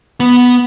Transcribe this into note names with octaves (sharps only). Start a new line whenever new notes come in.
B3